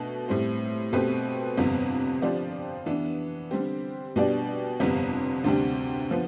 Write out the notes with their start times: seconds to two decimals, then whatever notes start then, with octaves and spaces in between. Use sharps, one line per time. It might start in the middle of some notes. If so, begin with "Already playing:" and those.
Already playing: B2 A3 D4
0.28 A2 G3 C4
0.93 B2 A3 C4 G4 B4
1.57 G1 F2 C3 G3 B3
2.22 D3 F3 C4 G4 D5
2.86 E3 B3 D4
3.51 D3 G3 C4 G4
4.16 B2 G3 D4 G4 D5
4.80 G1 F2 C3 G3 B3
5.44 D2 C3 G3 D4 G4
6.11 D3 F3 B3